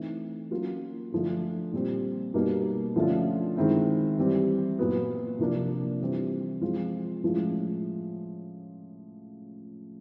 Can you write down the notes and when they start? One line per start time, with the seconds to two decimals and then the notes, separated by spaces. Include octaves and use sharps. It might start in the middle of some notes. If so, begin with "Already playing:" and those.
Already playing: E3 A3 C4 D#4
0.51 F#3 A#3 C#4 F4
1.12 D3 F3 A3
1.73 A#2 G3 C4
2.34 B2 G3 A#3 D#4
2.96 D3 F3 A3 C#4 F4
3.57 D#3 G#3 C4 E4
4.17 E3 G3 C4
4.79 A#2 F#3 B3
5.39 C3 F3 A#3 D4
6.01 E3 G3 C4
6.61 F3 G#3 C4 F4
7.23 A2 F3 G#3 C#4 F4